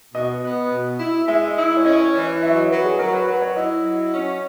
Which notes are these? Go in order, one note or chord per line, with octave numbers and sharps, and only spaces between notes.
B2 D#5
B3
B2
E4
G#3 E5
D#5
E4
E5
C#5
C#4 D#5
C#5
E3 C#5
D#5
F#3 E5
D#5
F#3 B4
G#4
F#3 A#4
B4
F#3 B4
C#5
E4 D#5
F#3
C#4